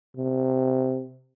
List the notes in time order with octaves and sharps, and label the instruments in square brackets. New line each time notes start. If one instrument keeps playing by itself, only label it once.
[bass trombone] C3